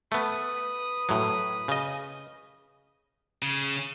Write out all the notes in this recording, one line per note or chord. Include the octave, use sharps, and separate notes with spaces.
A3 B3 B4 D#6
A2 F#3
C#3 D#5
C#3